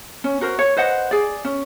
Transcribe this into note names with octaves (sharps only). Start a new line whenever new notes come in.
C#4
F#4 A#4 C5
C#5
B4 C5 D#5 F#5
G#4 D5
C#4